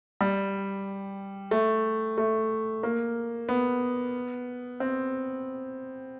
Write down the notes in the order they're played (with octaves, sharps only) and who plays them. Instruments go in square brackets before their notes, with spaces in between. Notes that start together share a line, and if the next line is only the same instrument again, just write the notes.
[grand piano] G3
A3
A3
A#3
B3
C4